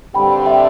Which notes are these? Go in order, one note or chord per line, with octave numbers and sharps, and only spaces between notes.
G2 D3 G3 C4 G4 G5 B5
E5 G5